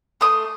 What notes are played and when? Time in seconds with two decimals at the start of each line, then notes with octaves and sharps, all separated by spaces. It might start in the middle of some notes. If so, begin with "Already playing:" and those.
0.21 A3 C6 D#6